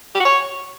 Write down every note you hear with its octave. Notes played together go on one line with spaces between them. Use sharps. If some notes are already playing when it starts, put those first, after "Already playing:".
G4
F#4
C#5